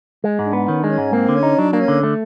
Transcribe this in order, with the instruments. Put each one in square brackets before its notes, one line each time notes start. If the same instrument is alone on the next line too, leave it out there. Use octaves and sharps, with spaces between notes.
[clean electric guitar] G#3
G#2
[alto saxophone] D4
[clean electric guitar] B3
[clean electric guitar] D#3 [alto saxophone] C#4
[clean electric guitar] G#3 [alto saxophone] D4
[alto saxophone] C#4
[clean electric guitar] G#2
[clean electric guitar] A#3 [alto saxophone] C4
[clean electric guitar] D3
[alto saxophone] C#4
[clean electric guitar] D#4
[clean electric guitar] F#3 [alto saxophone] D4
[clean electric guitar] A#3 [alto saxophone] D4
[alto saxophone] C#4
[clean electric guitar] D3
A3